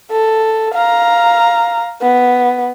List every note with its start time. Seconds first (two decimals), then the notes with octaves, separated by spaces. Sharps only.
0.11 A4
0.74 F5 A#5
2.01 B3